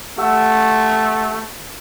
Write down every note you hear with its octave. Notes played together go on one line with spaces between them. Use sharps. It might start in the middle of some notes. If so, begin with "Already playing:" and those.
A3 G4 F#5 E6